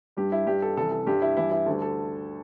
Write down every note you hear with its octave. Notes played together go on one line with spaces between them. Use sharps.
G2 G3 G4
E4
G2 G3 G4
A4
C2 C3 E3 A4
A4
G2 G3 G4
E4
G2 E3 G3 E4
E4
D2 D3 G3 A4
A4